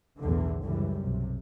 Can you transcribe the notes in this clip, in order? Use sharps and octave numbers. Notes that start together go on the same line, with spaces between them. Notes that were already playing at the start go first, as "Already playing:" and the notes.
B1 E2 A2 D3
C#2 F#2 E3 G3
B1 C3